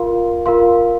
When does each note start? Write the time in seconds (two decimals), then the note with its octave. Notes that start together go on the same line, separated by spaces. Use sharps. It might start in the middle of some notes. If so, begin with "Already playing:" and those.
Already playing: F4 A#4 F5 C6
0.46 F4 A#4 F5 C6